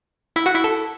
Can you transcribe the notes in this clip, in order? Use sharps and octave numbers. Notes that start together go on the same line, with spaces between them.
E4 E5
F#4 F#5
E4 E5
A4